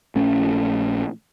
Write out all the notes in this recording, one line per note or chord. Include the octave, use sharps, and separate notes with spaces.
A#1 A3 C#4